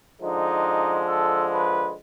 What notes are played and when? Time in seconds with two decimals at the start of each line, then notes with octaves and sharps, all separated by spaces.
0.21 D3 F3 G#3 D#4
1.07 A4
1.52 B4